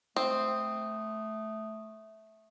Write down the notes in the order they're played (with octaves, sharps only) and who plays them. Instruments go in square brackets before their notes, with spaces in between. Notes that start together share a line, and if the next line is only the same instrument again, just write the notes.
[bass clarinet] A3 [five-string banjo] C4 [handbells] D#6